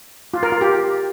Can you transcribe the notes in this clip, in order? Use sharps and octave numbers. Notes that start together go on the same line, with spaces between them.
F4
A#4
F4
G4